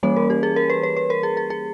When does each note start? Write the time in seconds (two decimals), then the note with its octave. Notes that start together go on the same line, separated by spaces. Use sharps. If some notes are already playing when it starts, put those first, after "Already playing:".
0.03 E3 G3 A#3 C#4 C#5
0.16 A#4
0.30 G4
0.43 G#4
0.56 A#4
0.70 B4
0.83 B4
0.97 B4
1.10 A#4
1.23 G#4
1.37 G#4
1.50 G#4